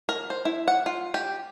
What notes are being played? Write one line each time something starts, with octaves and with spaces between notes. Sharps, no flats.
A#4
C5
E4
F#5
F4
G4